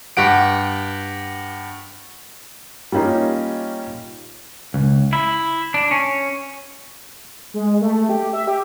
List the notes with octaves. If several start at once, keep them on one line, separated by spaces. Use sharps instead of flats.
G2 G4 F#5 D7
G3 A#3 C#4 D#4 F4
C#2
E4
D4
C#4
G#3
A3
G4
E5
G4